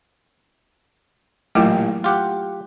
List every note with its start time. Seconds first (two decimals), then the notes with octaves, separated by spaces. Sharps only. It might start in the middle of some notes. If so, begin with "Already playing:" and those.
1.55 A1 A#2 F#3 A3 E4 G4
2.04 F4 G4 F#5